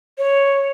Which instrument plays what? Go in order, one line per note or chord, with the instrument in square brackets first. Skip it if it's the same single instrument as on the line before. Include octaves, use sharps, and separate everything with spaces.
[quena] C#5